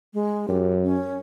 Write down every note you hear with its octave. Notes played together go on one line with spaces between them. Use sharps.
G#3
F#2 G4
C#4